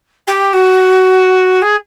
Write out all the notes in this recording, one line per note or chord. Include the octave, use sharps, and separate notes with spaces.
G4
F#4
G#4